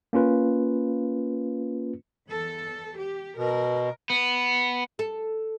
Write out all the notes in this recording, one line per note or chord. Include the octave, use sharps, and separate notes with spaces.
A#3 C#4 F4 B4
E2 A4
G4
B2 A#4
B3
A4